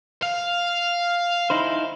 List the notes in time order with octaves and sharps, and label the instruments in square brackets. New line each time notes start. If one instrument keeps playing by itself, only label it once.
[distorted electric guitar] F5
[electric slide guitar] D#4 E4 C5